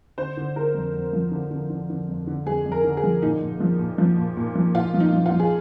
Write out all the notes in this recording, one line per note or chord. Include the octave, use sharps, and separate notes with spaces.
D3 C5
D3
D3 A#4
F2
F2
F3
D3
D3
D3
D3
F2
D3
F2 G#4
F2
A#4
D3
G#4
F3
A#2 D#4
A#2
F3
A#2
F3
A#2
A#2
F3
A#2 F4
F3
D#4
F3
F4
F3
G#4